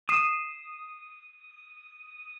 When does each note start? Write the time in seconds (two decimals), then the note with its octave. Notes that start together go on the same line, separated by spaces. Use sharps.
0.09 D#6 C7 D#7 E7